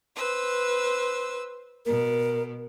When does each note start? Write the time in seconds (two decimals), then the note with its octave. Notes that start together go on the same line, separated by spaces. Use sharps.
0.14 B4 C5 E6
1.86 B2 A#4